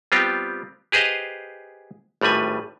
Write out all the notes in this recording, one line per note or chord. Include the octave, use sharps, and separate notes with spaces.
G3 B3 C4 F4 G4
G4 G#4 B4 C5 D#5 F5
G#1 A2 G3 B4 G#5